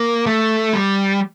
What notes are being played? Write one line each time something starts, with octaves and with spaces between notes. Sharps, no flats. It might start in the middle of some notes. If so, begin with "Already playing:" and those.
Already playing: A#3
A3
G3